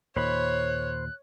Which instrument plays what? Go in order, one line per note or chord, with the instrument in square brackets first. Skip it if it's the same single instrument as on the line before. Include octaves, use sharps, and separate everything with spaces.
[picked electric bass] D#2 A#2 [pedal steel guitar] C5 B5 [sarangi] C#5 [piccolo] F#6